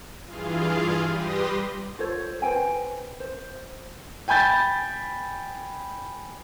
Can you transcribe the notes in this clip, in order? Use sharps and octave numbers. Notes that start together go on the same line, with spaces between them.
G2 E3 F4 G#4 F5
G3 G4 B4 C6 D#6 A#6
F4 A4 C5 C#5
B4 C5 G5 G#5
C5
G5 G#5 B5 G6 A6